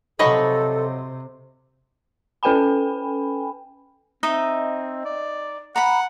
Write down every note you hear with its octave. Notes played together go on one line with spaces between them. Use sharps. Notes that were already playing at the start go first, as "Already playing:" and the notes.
C3 F3 F#3 D#4 A4 D#5 B5 C#6
C#4 A4 B4 G5 G#5 B5
C4 D#4 D#5 E5
D5
F#5 A#5 B5